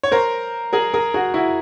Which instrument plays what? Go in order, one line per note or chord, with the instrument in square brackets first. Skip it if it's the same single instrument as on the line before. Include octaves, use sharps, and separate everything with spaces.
[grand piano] C#5
A#4 C5
G#4 A#4
G#4 A#4
F#4 G#4
E4 F#4